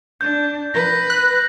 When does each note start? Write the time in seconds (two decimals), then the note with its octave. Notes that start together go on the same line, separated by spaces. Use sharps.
0.21 D4 G6
0.74 B4 A#6
1.10 F#6